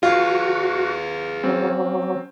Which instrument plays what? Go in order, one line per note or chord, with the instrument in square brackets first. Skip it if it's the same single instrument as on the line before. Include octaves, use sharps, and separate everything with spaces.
[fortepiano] F4 [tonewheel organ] F#4 [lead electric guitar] G#4 B4
[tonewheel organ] F#3 [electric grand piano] C4 C#4